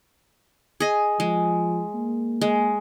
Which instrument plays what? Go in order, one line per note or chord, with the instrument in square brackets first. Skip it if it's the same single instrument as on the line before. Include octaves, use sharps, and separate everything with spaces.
[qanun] G#4 D#5
[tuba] F3 [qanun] G#3
[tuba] A#3
[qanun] G#3